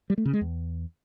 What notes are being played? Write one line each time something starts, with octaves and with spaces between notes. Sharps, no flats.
G3
A3
C#3
G#3
E2